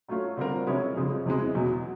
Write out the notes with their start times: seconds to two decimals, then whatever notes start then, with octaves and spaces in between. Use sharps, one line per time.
0.08 F#3 A3 C#4 F4
0.37 D3 G3 C4 F4 A#4
0.67 C3 F3 G#3 C#4 E4
0.96 F2 C#3 F3 G#3
1.26 E2 C3 E3 G#3
1.55 E2 B2 F#3